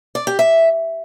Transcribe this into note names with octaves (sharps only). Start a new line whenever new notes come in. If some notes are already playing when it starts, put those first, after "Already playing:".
D5
G4
E5